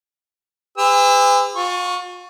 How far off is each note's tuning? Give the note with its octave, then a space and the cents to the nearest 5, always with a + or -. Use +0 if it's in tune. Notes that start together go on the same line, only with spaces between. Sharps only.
G#4 -45 B4 +45 E6 +0
F4 +40 C#6 +0